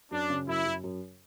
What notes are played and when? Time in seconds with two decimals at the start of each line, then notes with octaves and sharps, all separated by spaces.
0.11 F#2 D4
0.30 C#3
0.48 F#2 E4
0.66 F#2
0.84 F#2